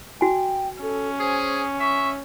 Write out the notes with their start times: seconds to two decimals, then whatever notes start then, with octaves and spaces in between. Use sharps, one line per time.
0.21 F#4 G5 G#5
0.82 C#4 A4
1.20 G#4 C5
1.80 E5 C#6